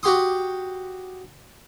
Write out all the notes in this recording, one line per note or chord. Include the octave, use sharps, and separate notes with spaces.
F#4 G4 C6 D#6